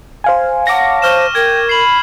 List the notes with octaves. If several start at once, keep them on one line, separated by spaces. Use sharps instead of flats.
C5 F5 G#5
C#5 F5 F#5 A5 D6 A#6
C5 C#6 F6 E7
A#4 G5 G#6
B5 C7 F#7